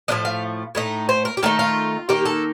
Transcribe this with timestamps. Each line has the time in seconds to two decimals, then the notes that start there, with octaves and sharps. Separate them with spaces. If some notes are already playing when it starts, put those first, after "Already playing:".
0.08 A2 F3 A3 D4 D#5
0.25 F5
0.75 A2 A3 D#4
1.09 C5
1.25 A#4
1.37 G4
1.43 D#3 A3 D#4 A4
1.59 F4
2.09 D#3 A#3 D#4 G4
2.26 A4